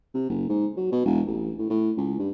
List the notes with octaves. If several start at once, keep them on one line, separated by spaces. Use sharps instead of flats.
C3
F#1
G#2
F#3
B2
E1
A1
A2
A2
C#2
G2